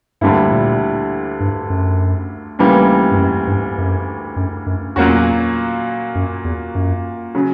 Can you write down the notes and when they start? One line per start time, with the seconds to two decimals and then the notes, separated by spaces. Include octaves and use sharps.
0.21 D2 G2 D3 G3 A#3 E4
0.51 A#2
1.40 G2
1.70 F#2
2.59 D2 C#3 E3 G3 A#3
3.11 G2
3.18 F#2
3.47 G2
3.78 F#2
4.36 F#2
4.66 F#2
4.96 E2 A#2 F#3 A#3 C#4 F#4
6.15 F#2
6.45 E2
6.75 F#2
7.34 C#3 F#3